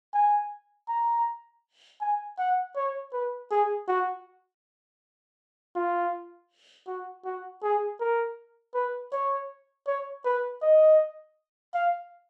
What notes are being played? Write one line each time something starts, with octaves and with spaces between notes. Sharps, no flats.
G#5
A#5
G#5
F#5
C#5
B4
G#4
F#4
F4
F#4
F#4
G#4
A#4
B4
C#5
C#5
B4
D#5
F5